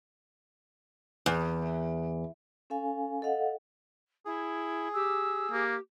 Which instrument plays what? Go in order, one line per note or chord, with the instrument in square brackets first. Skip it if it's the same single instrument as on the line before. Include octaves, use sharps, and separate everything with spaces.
[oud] E2
[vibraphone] C#4 A4 F5 G#5
A4 D#5 F5 F#5
[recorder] E4 [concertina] G#4
[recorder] G4 [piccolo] E6
[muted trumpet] A#3 [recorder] G4